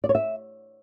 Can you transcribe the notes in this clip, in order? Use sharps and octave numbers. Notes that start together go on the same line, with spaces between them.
D5
C#5
E5